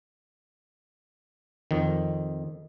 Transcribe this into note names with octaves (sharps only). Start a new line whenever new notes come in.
F2 D#3